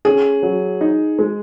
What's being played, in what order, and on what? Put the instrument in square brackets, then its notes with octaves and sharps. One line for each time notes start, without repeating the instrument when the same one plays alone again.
[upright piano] C#4 [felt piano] G#4
[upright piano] F#3
D#4
G#3